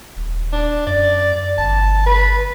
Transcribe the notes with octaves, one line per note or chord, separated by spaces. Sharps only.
D#1
D4
F#2 D5
G1 A5
B4